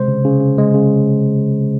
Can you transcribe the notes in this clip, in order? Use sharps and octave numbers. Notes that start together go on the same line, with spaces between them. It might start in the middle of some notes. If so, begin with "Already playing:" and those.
Already playing: C3 G#3 C5
C#3
C#3
C#3
G#3
C#3